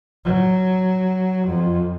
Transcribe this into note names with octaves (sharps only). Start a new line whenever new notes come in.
F#3
F2